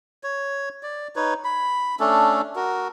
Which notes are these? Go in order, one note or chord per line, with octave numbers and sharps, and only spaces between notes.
C#5
D5
D#4 B4 C#5
B5
A3 C#4 D4 A4
F#4 A#4